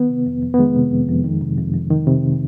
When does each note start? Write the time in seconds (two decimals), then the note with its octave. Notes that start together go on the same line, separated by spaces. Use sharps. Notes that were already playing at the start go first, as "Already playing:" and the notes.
Already playing: D#3 B3
0.10 C3
0.26 F2
0.42 F2
0.54 B3
0.59 D#3 G#3
0.76 C3
0.92 F2
1.08 F2
1.24 D#3
1.41 C3
1.57 F2
1.74 F2
1.91 D#3
2.07 C3